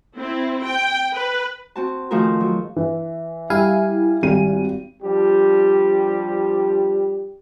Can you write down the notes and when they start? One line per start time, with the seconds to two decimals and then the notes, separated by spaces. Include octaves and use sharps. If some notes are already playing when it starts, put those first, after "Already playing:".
0.17 C4 E4
0.62 G5
1.14 B4
1.76 C4 F#4 A5
2.11 D#3 F3 A3 F#4 G#4 A#4
2.40 F#3
2.76 E3
3.50 G3 E4 F5 G#5
4.23 G#1 G3 D#7
5.03 F3 G3 D4 G4